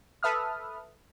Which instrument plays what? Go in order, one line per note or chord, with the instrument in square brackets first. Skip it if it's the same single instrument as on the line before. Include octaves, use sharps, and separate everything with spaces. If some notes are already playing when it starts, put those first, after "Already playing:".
[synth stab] A4 B4 E5 D#6 F6